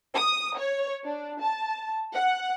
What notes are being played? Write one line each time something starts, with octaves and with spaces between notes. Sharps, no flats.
D#6
C#5
D4
A5
F#5